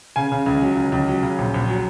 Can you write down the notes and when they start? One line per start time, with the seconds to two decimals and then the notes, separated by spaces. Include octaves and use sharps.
0.16 C#3 G#5
0.32 C#3
0.46 C#2
0.62 F#3
0.77 C#2
0.92 C#2
1.08 F#3
1.23 C#3
1.38 A#1
1.54 A#1
1.69 F#3